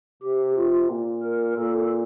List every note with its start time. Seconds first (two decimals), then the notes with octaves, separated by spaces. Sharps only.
0.22 C3 G4
0.56 F4
0.89 A#2
1.23 A#4
1.57 A#2 A4